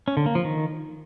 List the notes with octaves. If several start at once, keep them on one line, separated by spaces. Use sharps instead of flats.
C#4
D3
A#3
F3
D#3